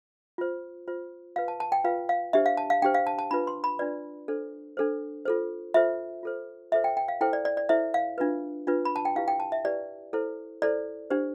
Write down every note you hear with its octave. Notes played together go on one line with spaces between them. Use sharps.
F4 C5
F4 C5
F4 B4 F5
A5
A5
G5
F4 B4 F5
F5
D4 G4 C5 E5
F5
A5
F5
D4 G4 C5 G5
F5
A5
A5
D4 F4 B4 B5
C6
B5
D4 F4 B4 D5
D4 A4 C5
D4 A4 C5
F4 A4 C5
F4 A4 C5 E5
F4 A4 C5
F4 A4 C5 E5
G5
G5
F5
E4 A4 C5 G5
D5
D5
D5
E4 A4 C5 E5
F5
D4 F4 B4
D4 F4 B4
B5
A5
G5
E4 G4 B4 F5
G5
A5
E5
E4 G4 B4 D5
E4 A4 C5
E4 A4 C5 D5
D4 G4 C5